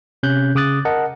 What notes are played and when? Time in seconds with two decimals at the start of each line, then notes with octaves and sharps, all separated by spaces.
0.23 C3 C#4 F#6 G6
0.55 C#3 D6 D#6 F#6 A6
0.85 A#4 D#5 F#5 A5